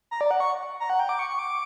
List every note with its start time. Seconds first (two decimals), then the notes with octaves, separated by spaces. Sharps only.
0.11 A#5
0.21 D5
0.31 F#5
0.40 C#6
0.80 A#5
0.90 F#5
1.00 G5
1.09 D6
1.19 C#6
1.29 C#6
1.39 D6